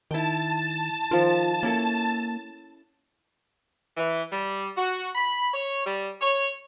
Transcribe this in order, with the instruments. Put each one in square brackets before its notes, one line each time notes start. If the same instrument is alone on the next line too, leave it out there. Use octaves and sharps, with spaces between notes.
[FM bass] D#3 [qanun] E4 G5 [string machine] A5
[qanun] D#3 F3 [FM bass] F4
[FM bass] A#3 [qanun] C#4 E4 A4
[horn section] E3
G3
F#4
B5
C#5
G3
C#5